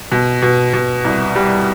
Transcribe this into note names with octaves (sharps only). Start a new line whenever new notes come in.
B2
B2
B2
C2
G3